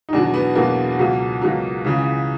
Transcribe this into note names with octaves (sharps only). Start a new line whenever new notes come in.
D#4
E2 B2 F#3 D4
B3
E2 B2 F#3 A#3
C#2 B2 F#3
C#2 B2 F#3
C#2 C#3 E3